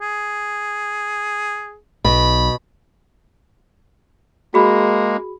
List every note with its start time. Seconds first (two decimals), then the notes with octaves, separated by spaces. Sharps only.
0.01 G#4
2.04 B1 B2 B5
4.54 G#3 A#3 F#4 G#4 B5